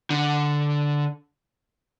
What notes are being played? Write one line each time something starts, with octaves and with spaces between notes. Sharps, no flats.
D3